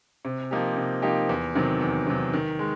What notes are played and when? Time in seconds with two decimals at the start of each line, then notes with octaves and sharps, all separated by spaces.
0.25 C3
0.51 F3 A#3 D#4 G4
0.77 C3
1.02 F3 A#3 D#4 G4
1.29 E2
1.55 C3 D#3 F#3
1.81 E2
2.07 C3 D#3 F#3
2.33 D#3
2.59 G#3